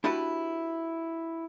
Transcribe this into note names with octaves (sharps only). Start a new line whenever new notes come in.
D4 E4 F#4 G4 B4